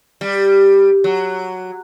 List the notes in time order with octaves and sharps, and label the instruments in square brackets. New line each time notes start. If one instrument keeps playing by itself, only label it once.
[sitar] G3
F#3